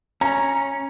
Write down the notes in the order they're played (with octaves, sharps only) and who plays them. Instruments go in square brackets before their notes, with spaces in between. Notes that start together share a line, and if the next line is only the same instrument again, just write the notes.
[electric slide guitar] C#4 [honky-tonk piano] A#5